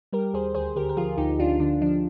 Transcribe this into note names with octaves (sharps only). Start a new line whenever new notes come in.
G3 G4 A#4
D#2 G#4 C5
D2 G#4 C5
D3 G4 A#4
A#4
F3 F4 G#4
D2 D#4 G4
D2 D4 F4
D3 D4
F3 D4